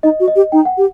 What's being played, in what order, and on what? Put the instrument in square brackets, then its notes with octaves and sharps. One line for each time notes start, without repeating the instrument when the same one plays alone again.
[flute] D#4 [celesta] D#5
[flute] F#4
[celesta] D#5
[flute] G4
[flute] D#4 [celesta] G5
[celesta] F#5
[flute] G4